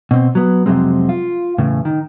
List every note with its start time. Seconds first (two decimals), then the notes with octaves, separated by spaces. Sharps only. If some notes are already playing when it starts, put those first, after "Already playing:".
0.11 B2 C4
0.35 F#3 B3
0.66 F2 C3 E3 F#3 G#3 C4
1.09 F4
1.58 E2 A2 C#3
1.85 D#3